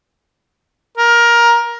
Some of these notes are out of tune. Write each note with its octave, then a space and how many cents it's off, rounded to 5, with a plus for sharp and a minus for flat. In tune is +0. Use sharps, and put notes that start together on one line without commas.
A#4 +15